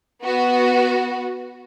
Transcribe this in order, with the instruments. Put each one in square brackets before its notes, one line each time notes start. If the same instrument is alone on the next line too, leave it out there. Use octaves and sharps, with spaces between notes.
[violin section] B3 F#4